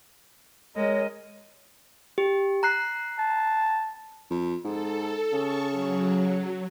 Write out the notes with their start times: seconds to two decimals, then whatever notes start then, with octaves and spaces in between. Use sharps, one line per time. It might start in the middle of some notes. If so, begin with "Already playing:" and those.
0.76 G#3 A#4 C#5 D#5
2.18 G4
2.63 A#5 F#6 C7
3.18 A5
4.30 F2
4.65 G#2 A4
5.33 C#3 A5 C#6
5.70 F#3